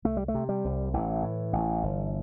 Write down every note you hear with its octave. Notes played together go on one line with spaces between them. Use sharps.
C2 A3
G3
A3
C3
G3
C2
A1 E3
A2
A1
G1